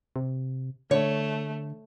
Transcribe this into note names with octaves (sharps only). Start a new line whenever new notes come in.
C3
D3 A3 C#5